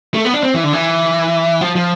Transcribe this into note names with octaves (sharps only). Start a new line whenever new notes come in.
A3
B3
D4
C4
E3
D3
E3
F3
F3